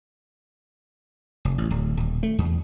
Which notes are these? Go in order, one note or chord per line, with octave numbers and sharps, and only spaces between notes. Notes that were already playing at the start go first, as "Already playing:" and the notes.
F1
A1
D1
D#1
A3
E2